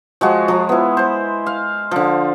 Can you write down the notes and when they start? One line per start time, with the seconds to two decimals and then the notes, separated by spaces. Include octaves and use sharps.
0.21 F3 G#3 F#4
0.48 F3 A#5
0.69 B3 E4
0.97 C5 B5
1.46 F5
1.91 D3 F3